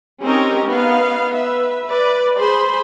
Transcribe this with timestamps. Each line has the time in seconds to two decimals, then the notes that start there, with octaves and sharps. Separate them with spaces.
0.24 C4 C#4 D#4 G4 A#4 D#5
0.68 B3 D#4 F5
1.31 B4 E5
1.86 B4 D5
2.37 G#4 C5 B5 C6